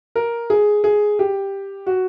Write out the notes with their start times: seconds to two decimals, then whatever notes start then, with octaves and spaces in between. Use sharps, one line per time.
0.15 A#4
0.50 G#4
0.84 G#4
1.19 G4
1.86 F#4